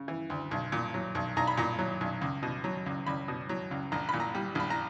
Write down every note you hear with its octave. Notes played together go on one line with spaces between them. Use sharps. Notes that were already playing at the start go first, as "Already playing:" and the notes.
Already playing: C#3
E3
D2
B1
A#2
F#3
B1
B1 A#5
B5
A#2 A#5
F#3
B1
C#2
B2
F#3
C#2
C#2 B5
B2
F#3
C#2
A#1 A#5
A#2 B5
A#5
G3
A#1 B5
A#5